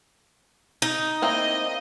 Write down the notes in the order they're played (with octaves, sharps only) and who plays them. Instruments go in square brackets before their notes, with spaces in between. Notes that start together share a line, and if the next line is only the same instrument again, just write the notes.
[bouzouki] D#4
[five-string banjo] A#3 C4 E4 [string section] D#5